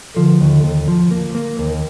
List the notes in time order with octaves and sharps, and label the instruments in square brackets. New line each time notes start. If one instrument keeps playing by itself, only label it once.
[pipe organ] D3 [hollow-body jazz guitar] F3
[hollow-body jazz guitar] D#2
D#2
F3
A#3
A#3
[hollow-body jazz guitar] D#2 [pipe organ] D#3